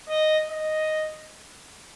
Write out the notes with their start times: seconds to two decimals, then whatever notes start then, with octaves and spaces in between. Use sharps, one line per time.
0.09 D#5
0.50 D#5